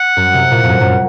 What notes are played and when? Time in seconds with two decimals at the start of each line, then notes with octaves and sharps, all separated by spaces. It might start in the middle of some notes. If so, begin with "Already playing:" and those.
Already playing: F#5
0.17 F#2
0.34 C3
0.51 A#2
0.63 F2
0.69 F#2
0.81 F#2